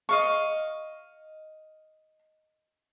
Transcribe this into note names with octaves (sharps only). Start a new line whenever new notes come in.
D#5 F5 C#6